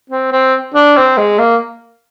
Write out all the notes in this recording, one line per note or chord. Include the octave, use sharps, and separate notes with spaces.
C4
C4
D4
C4
G#3
A#3